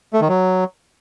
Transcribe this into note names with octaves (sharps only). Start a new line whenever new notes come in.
A3
D#3
F#3